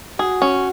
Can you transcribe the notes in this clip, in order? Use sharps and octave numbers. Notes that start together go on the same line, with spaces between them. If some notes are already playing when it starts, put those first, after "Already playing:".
F#4 G#4
C#4